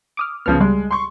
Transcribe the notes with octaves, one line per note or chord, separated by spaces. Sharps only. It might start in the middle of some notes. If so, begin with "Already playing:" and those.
D6 D#6 F6
C#2 C#3 F3 B3 F6
G3 G#3
C6 C#6